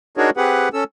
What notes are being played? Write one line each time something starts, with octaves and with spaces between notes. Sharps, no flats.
D4 D#4 F#4 G#4 A#4 C#5
C4 G4 G#4 B4 F#5
C#4 A4 E6